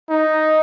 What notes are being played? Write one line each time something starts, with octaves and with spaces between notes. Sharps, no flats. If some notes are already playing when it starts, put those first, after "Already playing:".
D#4